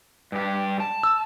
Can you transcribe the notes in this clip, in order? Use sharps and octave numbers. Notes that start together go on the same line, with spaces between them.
G2 G4
A5
E6